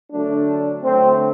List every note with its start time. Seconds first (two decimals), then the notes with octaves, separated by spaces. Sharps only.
0.12 D3 F#3 A3 D4
0.83 D3 F#3 A3 C4